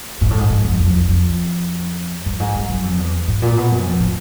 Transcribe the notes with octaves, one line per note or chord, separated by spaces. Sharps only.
G#2
A2
G#2
G#2
F2
F2
F2
F2
G2
G#2
G2
F#2
F2
E2
G#2
A#2
B2
F#2
F2
A2